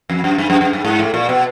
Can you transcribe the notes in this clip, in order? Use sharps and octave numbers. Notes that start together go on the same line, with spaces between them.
F2
F#2
G2
F#2
F#2
G2
G#2
A2
A#2
B2